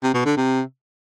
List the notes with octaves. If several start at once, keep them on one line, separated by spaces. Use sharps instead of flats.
C3
B2
D3
C3